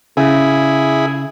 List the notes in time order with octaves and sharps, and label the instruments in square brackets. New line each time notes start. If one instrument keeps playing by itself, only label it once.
[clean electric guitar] C#3 [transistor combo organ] E4 G#4